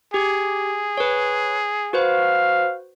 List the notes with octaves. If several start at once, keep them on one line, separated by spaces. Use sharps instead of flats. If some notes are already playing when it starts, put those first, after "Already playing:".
G4 G#4
B4 C#5
F#4 B4 C5 F5